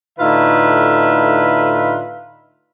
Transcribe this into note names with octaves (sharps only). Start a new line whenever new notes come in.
A2 D3 D#4 F4 B4 E5